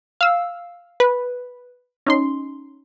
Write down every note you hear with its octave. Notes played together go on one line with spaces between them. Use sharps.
F5 E6
B4
C#4 D#4 C6